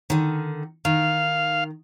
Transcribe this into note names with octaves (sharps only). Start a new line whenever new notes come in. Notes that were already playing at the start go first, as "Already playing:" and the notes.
D3 D#3
D#3 F5